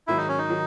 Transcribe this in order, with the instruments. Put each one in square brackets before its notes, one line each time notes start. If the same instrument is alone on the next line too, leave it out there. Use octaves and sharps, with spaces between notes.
[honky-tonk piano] G#2 D#3 F#3 [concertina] E4
[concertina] D#4
C#4
D#4
[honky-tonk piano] D#3 F#3